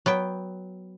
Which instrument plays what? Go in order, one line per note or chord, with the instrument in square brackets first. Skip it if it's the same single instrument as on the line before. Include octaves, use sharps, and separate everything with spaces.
[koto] F#3 B3 G5